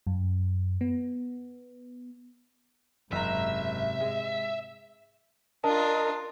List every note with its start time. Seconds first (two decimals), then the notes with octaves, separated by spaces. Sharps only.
0.07 F#2
0.81 B3
3.12 F#1 G#2 C3 E5 A#5
4.01 G#3
5.64 D4 F4 A#4 D#5 A5